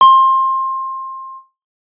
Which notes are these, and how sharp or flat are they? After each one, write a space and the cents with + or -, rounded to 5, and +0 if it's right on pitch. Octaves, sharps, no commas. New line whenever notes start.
C6 +20